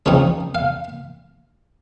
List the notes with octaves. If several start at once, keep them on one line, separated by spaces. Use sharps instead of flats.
C#3 F3 C4 D#4 C#5
F5